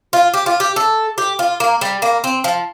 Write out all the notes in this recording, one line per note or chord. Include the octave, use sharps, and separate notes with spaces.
F4
G4
F4
G4
A4
G4
F4
A#3
G3
A#3
C4
F3